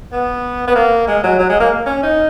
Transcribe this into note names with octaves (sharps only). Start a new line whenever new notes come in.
B3
B3
A#3
G#3
F#3
F#3
G#3
A#3
C#4
D#4